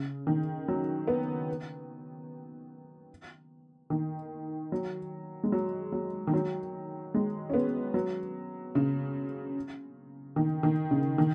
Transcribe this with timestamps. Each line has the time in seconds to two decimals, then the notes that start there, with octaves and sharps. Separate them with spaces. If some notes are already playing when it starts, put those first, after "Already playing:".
Already playing: C#3
0.27 D#3
0.68 F#3
1.08 B3
3.90 D#3
4.72 F#3
5.43 G#3
5.52 F#3
5.92 F#3
6.27 D#3
6.33 F#3
7.14 G#3
7.50 C#4
7.54 B3
7.94 F#3
8.75 C#3
10.36 D#3
10.63 D#3
10.91 C#3
11.18 D#3